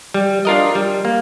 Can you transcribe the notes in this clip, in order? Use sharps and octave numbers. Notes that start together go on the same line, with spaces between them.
G3
D4 F4 A#4 D#5
G3
A#3